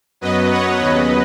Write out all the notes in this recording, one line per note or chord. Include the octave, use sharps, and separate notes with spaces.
F#2 F#3 B3 B4 D#5
C#5 F#5
D#2 C#3 F#3 B3 B4 D#5